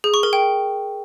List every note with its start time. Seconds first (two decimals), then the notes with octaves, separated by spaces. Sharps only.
0.04 G#4
0.14 C#6
0.23 A#4
0.33 G5